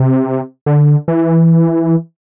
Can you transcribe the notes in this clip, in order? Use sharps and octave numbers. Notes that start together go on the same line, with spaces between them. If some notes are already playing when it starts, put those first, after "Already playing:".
Already playing: C3
D3
E3